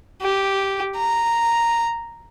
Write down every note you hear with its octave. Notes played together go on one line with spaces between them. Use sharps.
G4
A#5